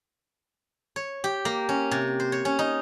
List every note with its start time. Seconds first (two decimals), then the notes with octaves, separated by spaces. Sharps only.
0.96 C#5
1.24 G4
1.45 A#3
1.69 C#4
1.91 C3
2.20 C5
2.32 C#5
2.45 C#4
2.59 D#4